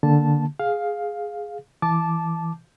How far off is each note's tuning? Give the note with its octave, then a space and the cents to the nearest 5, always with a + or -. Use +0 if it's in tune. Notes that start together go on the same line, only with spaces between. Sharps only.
D3 +0 A#3 +0 A5 -5
G#4 +0 F5 +10
E3 +0 A5 -10 D6 +0